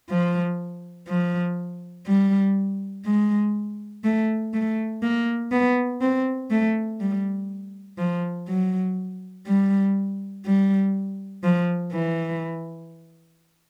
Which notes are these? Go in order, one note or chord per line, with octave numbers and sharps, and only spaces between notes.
F3
F3
G3
G#3
A3
A3
A#3
B3
C4
A3
G3
F3
F#3
G3
G3
F3
E3